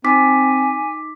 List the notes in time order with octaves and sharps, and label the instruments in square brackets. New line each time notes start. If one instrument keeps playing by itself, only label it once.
[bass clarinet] C4 [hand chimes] D#4 D6 B6 [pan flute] G#5